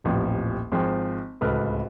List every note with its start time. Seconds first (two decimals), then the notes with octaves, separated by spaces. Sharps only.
0.04 D#1 A1 F3 C4
0.72 G#1 F3 G#4 C5 G5
1.41 D1 C#2 A4 B4 F6